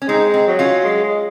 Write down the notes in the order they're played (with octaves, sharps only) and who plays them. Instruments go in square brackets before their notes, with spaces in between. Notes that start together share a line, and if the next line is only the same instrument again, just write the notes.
[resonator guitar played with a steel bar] C#4
[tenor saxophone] G#3 [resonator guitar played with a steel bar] C4 D#4
[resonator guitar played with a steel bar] C4 D#4
[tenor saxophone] F#3
[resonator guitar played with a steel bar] C#4 F4
[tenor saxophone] G#3
G#3